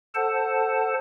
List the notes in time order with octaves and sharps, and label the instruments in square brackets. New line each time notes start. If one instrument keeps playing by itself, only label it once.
[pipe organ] A4 C5 F#5 A5